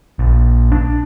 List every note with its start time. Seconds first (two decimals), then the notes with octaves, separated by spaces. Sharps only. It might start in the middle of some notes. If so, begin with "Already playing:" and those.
0.19 A#1
0.72 D4